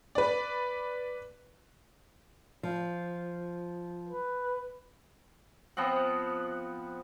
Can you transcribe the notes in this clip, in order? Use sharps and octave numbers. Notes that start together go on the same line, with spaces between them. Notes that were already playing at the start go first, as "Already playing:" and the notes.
B4 D5
F3
B4
F3 B3 C4 F#5